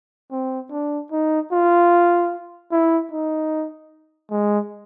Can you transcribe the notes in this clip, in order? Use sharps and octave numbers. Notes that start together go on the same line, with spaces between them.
C4
D4
D#4
F4
E4
D#4
G#3